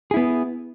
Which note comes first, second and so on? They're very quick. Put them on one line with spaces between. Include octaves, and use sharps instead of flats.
G#4 E4 B3